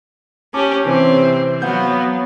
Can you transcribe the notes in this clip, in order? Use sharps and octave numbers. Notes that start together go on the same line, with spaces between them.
C#4 G4 A5 D6
C3 E3 C4
F#3 B3 F5 F#5 G6